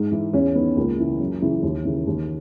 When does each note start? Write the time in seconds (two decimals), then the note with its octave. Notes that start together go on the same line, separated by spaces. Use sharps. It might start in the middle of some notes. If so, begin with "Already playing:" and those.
Already playing: G#2
0.12 E3
0.33 E2 C#4
0.55 D#3 B3
0.77 C#2 A#3
0.99 C#3 E3
1.19 F#2
1.41 C#3 E3
1.62 D#2
1.85 C#3 E3
2.07 D#2